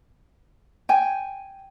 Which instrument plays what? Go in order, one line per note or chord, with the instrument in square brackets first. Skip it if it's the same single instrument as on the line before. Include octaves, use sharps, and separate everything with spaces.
[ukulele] G5 G#5